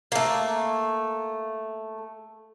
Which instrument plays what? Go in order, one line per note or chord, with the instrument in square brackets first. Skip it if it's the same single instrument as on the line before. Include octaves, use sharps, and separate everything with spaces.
[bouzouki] A3 A#3